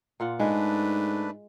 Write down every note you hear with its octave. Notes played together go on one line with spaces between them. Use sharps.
A#2 F4 F#5
G#2 G#3 A3 D4 B4